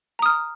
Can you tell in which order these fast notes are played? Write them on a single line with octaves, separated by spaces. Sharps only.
A#5 D#6 F6